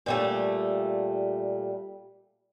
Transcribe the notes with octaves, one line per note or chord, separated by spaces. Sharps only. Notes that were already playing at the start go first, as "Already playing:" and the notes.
A#2 G3 A3